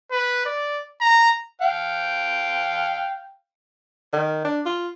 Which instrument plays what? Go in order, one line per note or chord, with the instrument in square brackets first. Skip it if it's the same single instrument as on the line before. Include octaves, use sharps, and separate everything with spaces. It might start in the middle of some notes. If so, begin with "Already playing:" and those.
[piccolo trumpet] B4
D5
A#5
[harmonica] F5 G5
[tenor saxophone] D#3
D4
F4